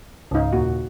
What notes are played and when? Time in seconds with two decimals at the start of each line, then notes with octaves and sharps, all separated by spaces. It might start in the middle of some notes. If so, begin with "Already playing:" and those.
0.31 C#2 G#2 C#3 D#4 F5
0.53 D#2 A#2 A#3 F#4